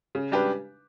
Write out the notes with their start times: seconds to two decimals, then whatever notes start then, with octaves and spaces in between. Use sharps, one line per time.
0.15 C#3
0.32 G3 D4 G4 B4